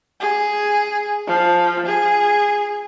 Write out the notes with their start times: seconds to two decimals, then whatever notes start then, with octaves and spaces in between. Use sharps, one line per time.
0.20 G#4
1.27 F3
1.86 G#4